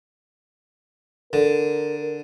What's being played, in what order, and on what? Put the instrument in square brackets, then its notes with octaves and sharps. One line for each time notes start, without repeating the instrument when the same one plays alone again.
[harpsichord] D3 [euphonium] A#4